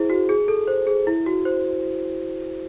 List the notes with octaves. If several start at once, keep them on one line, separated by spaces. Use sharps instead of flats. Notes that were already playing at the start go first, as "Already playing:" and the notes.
Already playing: E4 G#4 C5
F#4
G#4
A4
C5
G#4
E4
F#4
C5